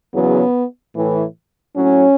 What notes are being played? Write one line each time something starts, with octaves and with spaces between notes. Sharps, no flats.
E2 C#3 F#3 B3
A2 E3
A2 F#3 C#4